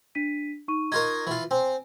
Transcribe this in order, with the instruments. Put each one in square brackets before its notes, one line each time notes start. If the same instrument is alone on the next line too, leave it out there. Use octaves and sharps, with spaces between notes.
[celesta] D4 B6 D#7
D#4 C#6 D#7
[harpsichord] D#4 F4 A#4 [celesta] C#6 G#6
[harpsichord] E3 F4
[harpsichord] C4 [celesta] G#5